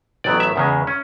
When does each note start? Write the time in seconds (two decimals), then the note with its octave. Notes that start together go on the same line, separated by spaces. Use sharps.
0.24 A1 A2 F#3 B3 D5
0.40 E5
0.56 E2 C#3 G#3
0.87 C#4